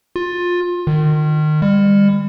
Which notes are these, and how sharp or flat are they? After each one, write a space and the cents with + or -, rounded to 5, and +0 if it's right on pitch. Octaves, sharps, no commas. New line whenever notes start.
F4 +20
D#3 -30
G3 +40